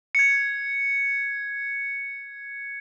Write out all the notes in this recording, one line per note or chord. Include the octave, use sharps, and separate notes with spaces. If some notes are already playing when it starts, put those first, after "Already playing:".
G#6 C#7